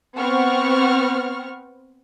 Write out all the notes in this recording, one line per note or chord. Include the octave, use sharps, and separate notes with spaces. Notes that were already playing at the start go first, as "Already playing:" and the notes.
B3 C4 F#5 C#6 F6